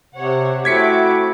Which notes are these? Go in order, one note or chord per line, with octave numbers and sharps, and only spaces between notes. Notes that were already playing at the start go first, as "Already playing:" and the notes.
C3 C5 C#5 F#5
A3 C4 E4 F#4 D6 G#6 B6 C#7